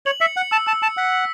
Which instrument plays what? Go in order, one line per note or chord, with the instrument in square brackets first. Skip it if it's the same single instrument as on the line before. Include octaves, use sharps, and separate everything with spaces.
[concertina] C#5 [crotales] F#7
[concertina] E5 [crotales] C#7
[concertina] F#5 [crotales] C#7
[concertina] A5 [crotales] E6
[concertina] A5 [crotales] E6
[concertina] A5 [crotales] C#7
[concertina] F#5 [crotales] B6
[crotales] B6